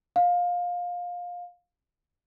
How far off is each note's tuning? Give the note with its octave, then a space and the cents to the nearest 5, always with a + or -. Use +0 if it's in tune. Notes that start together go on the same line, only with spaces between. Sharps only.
F5 +20